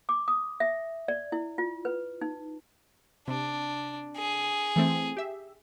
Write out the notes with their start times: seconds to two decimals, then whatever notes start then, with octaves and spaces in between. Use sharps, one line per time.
0.09 D6
0.28 D#6
0.60 E5
1.08 D5
1.32 E4
1.58 F4
1.85 B4
2.21 D#4
3.28 C3 D4
4.17 G#4
4.76 E3 A3 C4
5.17 G4 E5